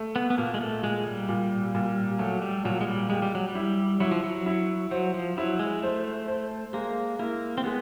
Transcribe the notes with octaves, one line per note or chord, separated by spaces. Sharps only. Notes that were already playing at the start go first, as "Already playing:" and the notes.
Already playing: A3
B3
B3
A#2 A#3
G#3
A3
A#2 G#3
G3
A#2
A#2
F#3 A3
G3
A#2 F#3
G#3
G3
G#3 G4
G3
F#3
G3
E4
F#3 E4
F3
F#3
E4
F#3 C5
F3
F#3 E4
G#3
A3 C5
C5
G#3 A#3
A#3 E4
C4
G#3 B3